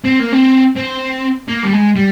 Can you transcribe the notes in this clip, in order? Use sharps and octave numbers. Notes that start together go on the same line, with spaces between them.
C4
A#3
C4
C4
A#3
G3
G#3
G3